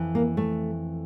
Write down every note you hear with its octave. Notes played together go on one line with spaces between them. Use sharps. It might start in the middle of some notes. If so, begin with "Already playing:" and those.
Already playing: F2 E3
A#3
A3